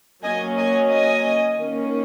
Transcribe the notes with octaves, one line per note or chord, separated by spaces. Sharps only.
F#3 A#3 C#4 D#5 G#5
D#5 G#5
D#5 G#5
D#3 A#3 C#4